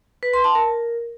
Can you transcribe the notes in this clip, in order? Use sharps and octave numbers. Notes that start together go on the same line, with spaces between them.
B4
C6
A5
A#4